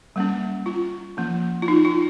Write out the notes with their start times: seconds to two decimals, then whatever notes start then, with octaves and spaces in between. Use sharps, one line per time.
0.16 G3 A#3 C#4
0.66 F4
1.17 F3 A#3 C#4
1.62 F4
1.68 D#4
1.85 F4